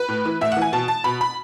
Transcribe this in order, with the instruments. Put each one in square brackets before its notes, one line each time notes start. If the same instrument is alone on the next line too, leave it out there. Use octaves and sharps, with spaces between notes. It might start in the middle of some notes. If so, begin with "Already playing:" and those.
Already playing: [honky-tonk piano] B4
A2
E3
A2 E5
F#5
E3
G#5
B2 A5
A5
B2 B5
B5